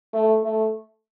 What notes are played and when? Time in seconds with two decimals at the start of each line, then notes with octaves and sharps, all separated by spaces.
0.14 A3
0.44 A3